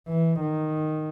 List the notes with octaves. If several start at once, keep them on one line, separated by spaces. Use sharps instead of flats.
E3
D#3